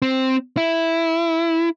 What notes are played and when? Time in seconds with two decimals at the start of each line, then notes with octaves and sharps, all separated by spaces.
0.02 C4
0.57 E4